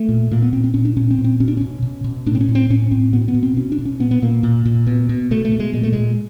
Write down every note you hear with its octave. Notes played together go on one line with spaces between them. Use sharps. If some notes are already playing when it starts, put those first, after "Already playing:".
Already playing: A3
A#2
A#2 A#3
B3
A#2 C4
C4
A#2 C#4
D4
A#2 C#4
C4
A#2
C4
B2 C#4
D4
B2 C#4
B2
B2
A2 D4
C4
C#4
A2
C4
A2 C#4
A2 C4
B2 B3
C4
B3
B2
C4
B2 C#4
D4
B2
C#4
A#2 B3
B3
A#2 A#3
A#2
A#2
B2
B2
B2 A3
A3
B2
G#3
A#2 G#3
A3
A#2 G#3